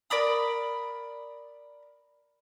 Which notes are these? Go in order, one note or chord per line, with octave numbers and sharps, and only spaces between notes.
A#4 D5 B5 D#6